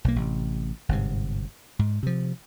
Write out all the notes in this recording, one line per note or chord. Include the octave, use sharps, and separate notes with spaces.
B1 A#3
A1 C3
G1 G#2 C3
G#2
C3 F3